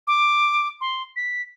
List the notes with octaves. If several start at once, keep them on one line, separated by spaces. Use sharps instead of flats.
D6
C6
B6